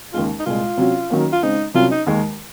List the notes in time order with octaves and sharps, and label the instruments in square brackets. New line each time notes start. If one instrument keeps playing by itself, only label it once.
[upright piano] D#2 C#3 G#3 [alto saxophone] F4
[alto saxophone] D#4
[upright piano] C2 A#2 G#3 [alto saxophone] F4
[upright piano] C3 F#3 C#4 F#4
D#3 F#3 A#3 C#4
[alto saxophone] F4
[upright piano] C#3 G#3 C4 [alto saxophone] D#4
[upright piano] C2 C3 F#3 C#4 [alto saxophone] F4
[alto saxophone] D#4
[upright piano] D#2 D#3 G#3